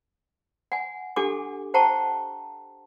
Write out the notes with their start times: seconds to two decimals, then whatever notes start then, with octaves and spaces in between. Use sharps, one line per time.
0.72 F#5 G#5
1.16 D4 G4 A4 F#5 G#5 D6
1.74 C5 F#5 G5 A5 A#5 C#6